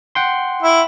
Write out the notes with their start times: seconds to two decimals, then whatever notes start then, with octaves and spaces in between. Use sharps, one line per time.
0.15 F#5 G5 C6
0.62 E4